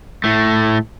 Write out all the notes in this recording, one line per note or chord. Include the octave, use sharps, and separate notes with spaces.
A2 A3